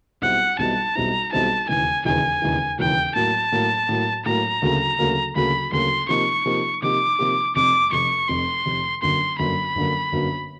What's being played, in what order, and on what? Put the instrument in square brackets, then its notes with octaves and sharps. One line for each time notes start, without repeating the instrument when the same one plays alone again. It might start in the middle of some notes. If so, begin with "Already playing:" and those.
[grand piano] B1 B2 G3 C4 E4 [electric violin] F#5
[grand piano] B1 B2 G3 C4 E4 [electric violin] A5
[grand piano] B1 B2 G3 C4 E4 [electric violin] A#5
[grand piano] B1 B2 G3 C4 E4 [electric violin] A5
[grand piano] E1 D#2 C#3 E3 [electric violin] G#5
[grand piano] E1 D#2 C#3 E3 [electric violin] G#5
[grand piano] E1 D#2 C#3 E3
[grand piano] E1 D#2 C#3 E3 [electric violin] G5
[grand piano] A2 F#3 A#3 [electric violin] A5
[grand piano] A2 F#3 A#3
A2 F#3 A#3
[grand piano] A2 F#3 A#3 [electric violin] A#5
[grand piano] D2 C#3 F#3 A#3
D2 C#3 F#3 A#3
[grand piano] D2 C#3 F#3 A#3 [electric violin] B5
[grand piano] D2 C#3 F#3 A#3 [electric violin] C6
[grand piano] C3 F3 A#3 D#4 G4 [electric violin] C#6
[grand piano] C3 F3 A#3 D#4 G4
[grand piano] C3 F3 A#3 D#4 G4 [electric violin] D6
[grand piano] C3 F3 A#3 D#4 G4
[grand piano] F1 F2 C3 [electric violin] D6
[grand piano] F1 F2 C3 [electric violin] C#6
[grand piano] F1 F2 C3 [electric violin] C6
[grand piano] F1 F2 C3
[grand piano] G1 F#2 D3 F#3 A#3 [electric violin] C6
[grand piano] G1 F#2 D3 F#3 A#3 [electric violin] B5
[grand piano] G1 F#2 D3 F#3 A#3
G1 F#2 D3 F#3 A#3